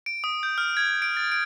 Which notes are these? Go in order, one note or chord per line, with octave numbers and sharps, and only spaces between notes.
D7
D#6
G6
F6
G#6
D7
A6
D7